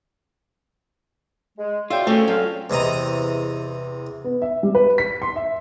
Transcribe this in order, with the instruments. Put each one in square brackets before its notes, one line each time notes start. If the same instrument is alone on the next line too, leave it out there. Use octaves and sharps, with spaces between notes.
[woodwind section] G#3
[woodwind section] C#3 F#4 G5 [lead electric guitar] F4 [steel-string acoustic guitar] D5 E5
[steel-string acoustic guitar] A3 [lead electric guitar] C4 C#4 [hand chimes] A4
[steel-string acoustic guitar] F#3 [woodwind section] F4 F5
[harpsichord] E2 C3 D#5 A#5
[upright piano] B3
E5
G3
B4
B6
C6
E5